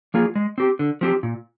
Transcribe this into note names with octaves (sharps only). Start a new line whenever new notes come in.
F3 A#3 F4 G#4
G#3
C4 G4
D3
F3 C4 G4
A#2